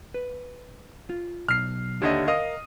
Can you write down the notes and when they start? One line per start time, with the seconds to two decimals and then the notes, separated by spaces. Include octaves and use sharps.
0.14 B4
1.10 F4
1.48 B1 F6 C7
2.02 D#2 D3 G4 C#5 D#5 E5
2.28 A#4 D#5 F5 D#6